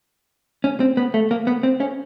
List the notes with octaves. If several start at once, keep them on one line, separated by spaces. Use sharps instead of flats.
C#4
C4
B3
A3
A#3
B3
C4
C#4